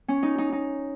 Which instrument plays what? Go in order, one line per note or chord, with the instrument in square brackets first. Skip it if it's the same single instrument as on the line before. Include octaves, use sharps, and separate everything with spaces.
[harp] C#4
D#4
D#4
D#4